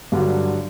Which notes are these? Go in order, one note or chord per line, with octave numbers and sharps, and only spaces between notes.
G2 D3 F#3